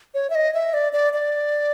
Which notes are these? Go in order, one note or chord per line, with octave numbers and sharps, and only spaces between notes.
C#5
E5
D#5
E5
D5
D5
D5